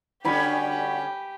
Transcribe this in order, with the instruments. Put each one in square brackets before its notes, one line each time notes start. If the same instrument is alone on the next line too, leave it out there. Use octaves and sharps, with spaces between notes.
[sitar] D3 G3 C#4 [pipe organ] F#4 [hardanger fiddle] G4 [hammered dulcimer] G#5 B5 C#6